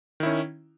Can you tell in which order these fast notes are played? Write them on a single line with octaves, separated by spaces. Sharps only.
D#3 E4 C#4